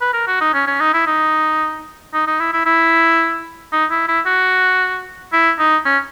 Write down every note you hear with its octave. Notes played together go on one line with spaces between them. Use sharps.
B4
A#4
F#4
D#4
C#4
C#4
D#4
E4
D#4
D#4
D#4
E4
E4
E4
D#4
E4
E4
F#4
E4
D#4
C#4